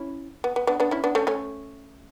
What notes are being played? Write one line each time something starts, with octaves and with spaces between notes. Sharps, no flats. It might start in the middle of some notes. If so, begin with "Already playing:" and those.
Already playing: C#4 E4
B3
B3
B3 D4
B3 D4
C#4 E4
B3 D4
A3 C#4
A3 C#4